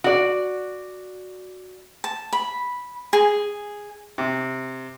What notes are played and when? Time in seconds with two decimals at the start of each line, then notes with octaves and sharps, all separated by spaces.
0.04 F#4 D5
2.04 A5
2.33 B5
3.13 G#4
4.18 C3